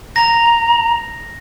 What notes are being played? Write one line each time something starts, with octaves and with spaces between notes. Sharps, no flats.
A#5 A#6